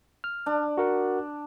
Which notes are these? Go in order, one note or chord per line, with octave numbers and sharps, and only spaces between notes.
F6
D4
F#4 A#4 F#5